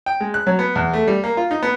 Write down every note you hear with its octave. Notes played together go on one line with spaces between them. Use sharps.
G5
G#3
F#6
F#3
B3
E2
A3
G3
A#3
F4
D#4
B3